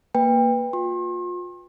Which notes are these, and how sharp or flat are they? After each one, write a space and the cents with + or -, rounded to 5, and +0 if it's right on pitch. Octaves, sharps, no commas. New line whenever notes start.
A#3 +0 B4 +0 G5 +30
F4 +30 C6 +40